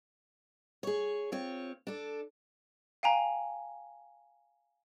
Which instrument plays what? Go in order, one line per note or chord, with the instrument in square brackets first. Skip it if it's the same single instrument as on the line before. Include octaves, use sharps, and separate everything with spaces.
[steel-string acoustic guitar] G#4 C#5
C4 F4 C#5
D4 A4
[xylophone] F5 G5 G#5 A#5